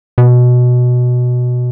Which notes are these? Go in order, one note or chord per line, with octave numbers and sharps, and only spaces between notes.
B2